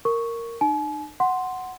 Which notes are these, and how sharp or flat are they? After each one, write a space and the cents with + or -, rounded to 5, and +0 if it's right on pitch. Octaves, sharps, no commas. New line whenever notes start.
A#4 -10 C#6 +0
D#4 -40 G#5 +45
F#5 +0 C6 +0